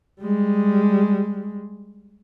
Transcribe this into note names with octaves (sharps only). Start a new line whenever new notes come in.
G3 G#3